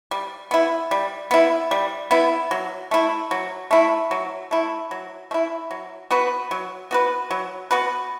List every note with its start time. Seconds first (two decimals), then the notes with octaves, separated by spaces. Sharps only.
0.11 G3
0.51 B3 E4
0.91 G3
1.31 B3 E4
1.71 G3
2.11 B3 E4
2.51 F#3
2.91 A3 E4
3.31 F#3
3.71 A3 E4
4.11 F#3
4.51 A3 E4
4.91 F#3
5.31 A3
5.34 E4
5.71 F#3
6.11 B3 F#4 B4
6.51 F#3
6.91 B3 F#4 B4
7.31 F#3
7.71 B3 F#4 B4